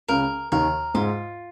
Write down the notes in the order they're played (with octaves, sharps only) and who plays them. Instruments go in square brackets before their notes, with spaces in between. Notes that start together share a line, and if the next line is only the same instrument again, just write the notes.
[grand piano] C#2 C#3 [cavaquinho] A#4
[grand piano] D#2 D#3 [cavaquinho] A#4
[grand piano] G#2 G#3 [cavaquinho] F4